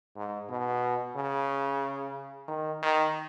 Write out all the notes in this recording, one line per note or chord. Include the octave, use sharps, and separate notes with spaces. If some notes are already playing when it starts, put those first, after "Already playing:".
G#2
B2
C#3
D#3
D#3